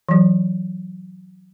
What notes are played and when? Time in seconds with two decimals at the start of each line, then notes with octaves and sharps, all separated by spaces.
0.09 E3 F#3